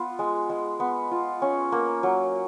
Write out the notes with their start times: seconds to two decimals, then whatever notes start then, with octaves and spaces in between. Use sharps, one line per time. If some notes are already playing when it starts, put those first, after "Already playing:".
Already playing: B3 F4
0.19 G#3
0.50 G#3
0.80 B3
1.11 F4
1.42 C#4
1.72 A#3
2.03 F#3